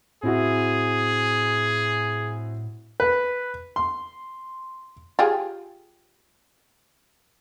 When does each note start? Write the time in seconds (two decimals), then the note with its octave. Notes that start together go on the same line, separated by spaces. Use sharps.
0.23 A2 C4 E4 F#4 G#4
3.00 B4
3.76 C6
5.19 F4 G4 G#4